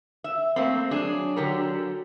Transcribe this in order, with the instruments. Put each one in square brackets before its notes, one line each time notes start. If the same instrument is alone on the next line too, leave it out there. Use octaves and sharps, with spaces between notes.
[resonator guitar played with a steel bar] E5
A3 A#3 C4
[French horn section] F#3 [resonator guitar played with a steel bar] D4 G#4
[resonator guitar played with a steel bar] D3 G4 A#4